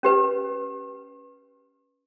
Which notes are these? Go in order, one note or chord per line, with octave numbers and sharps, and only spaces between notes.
C#4 G4 B4